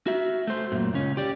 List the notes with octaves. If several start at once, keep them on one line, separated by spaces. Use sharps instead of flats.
F#4 E5
A3 C5
F#2 A#2
C#2 C#4
G4 D5